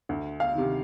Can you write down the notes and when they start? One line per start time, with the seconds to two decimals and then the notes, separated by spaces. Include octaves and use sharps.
0.09 D2
0.40 F5
0.55 C3 D#3